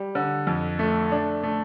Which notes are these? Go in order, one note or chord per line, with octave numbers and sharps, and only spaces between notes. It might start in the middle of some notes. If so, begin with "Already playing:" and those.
Already playing: G3
D3
F2
A3
D4
A3